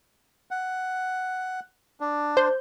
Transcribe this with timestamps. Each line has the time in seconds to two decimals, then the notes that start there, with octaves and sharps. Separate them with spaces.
0.51 F#5
2.00 D4
2.37 C5 G6